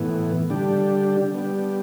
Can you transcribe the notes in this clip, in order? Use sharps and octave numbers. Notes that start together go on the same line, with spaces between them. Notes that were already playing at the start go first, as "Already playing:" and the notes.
Already playing: A2 E3 B3
D3 G3 D4 G4
G3 B3 D4 G4